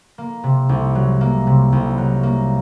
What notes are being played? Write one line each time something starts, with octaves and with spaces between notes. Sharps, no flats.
A#3
C3
C2
F#3
A#3
C3
C2
F#3
A#3